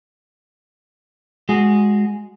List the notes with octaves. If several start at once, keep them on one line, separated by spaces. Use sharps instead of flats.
G#3 F#4 G#4